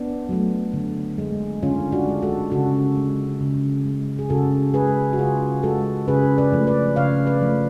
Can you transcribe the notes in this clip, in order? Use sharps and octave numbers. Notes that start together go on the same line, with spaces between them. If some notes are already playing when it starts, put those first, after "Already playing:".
Already playing: B3 D4
F#3 A3
D3
G#3
D3 C#4 F4
D4 F#4
G#3
F#4 A4
C#3 F#4 A4
G#3
C#3
G#3
G#4
C#3 F#4 A4
G#3 G#4 B4
F#4
C#3 F4 G#4
G#3 F#4 A4
C#3 G#4 B4
B4 D5
F3 A3
B4 D5
C#3 C#5 F5
B4 D5
F3 A3